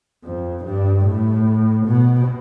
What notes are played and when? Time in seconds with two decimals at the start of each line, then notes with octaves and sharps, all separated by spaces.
0.24 F2
0.64 G2
1.05 A2
1.86 B2